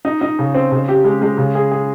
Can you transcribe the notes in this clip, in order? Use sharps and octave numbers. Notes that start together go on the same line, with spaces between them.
D#4
D#4
C#3
C4
C#3
G4
G#3
G#3
C#3
G#4
G#4